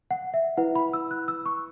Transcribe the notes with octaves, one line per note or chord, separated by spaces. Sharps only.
F#5
E5
E4 B4 F#5
B5
E6
F#6
E6
C#6